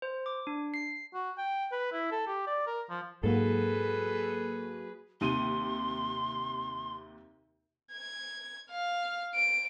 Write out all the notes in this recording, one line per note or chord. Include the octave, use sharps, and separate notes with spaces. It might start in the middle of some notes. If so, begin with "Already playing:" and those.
C5
D6
D4
C7
F#4
G5
B4
E4
A4
G4
D5
A#4
F3
G#2 F#3 A#3 F#4 G#4 A4 B4
D#2 C3 C6 D#7
G#6
F5
D7